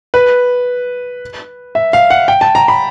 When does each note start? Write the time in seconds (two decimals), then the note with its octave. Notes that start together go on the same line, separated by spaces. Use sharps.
0.14 B4
1.75 E5
1.93 F5
2.10 F#5
2.28 G5
2.41 A5
2.55 A#5
2.68 B5